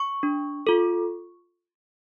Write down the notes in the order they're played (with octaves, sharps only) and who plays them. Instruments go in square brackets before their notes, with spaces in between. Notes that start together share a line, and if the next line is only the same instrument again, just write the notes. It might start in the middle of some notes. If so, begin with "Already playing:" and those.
Already playing: [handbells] C#6
D4
F4 A4